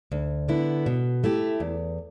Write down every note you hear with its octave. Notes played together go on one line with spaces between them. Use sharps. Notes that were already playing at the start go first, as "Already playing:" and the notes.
D2
D3 B3 E4
B2
A3 E4 G4
E2